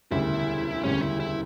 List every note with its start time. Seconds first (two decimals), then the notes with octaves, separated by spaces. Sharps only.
0.11 E1 D2 C#3 G3 E4
0.83 E1 D2 C#3 G3 C#4
1.02 E4
1.20 E4